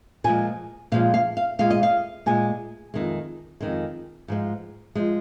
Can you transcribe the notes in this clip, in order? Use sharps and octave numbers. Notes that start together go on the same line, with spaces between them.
A#2 F3 G#3 G#5
A#2 F3 G#3 F5
F5
F5
A#2 G#3 F5
D#5
F5
A#2 G#3 G#5
F2 D#3 G#3
F2 D#3 G#3
G#2 F3 G#3
F3 G#3